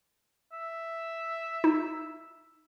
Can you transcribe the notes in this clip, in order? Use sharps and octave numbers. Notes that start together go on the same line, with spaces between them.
E5
D#4